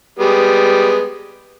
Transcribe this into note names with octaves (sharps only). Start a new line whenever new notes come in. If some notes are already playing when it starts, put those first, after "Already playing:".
G3 G#3 B3